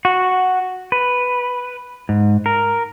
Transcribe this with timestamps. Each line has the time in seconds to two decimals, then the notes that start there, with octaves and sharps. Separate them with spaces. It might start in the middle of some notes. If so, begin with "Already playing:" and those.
0.05 F#4
0.92 B4
2.09 G#2
2.46 A#4